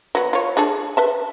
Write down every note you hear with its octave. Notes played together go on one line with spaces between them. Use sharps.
F#3 B3
F4 C#5
D4 G#4 A4
B4 E5 A5